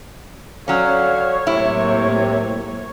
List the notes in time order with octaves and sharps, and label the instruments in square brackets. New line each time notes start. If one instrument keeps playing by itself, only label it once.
[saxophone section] D3 F5 [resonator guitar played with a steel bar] F#3 C#4 [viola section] C#5
[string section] A2 F#3 A#3 [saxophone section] C3 [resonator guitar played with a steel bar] E4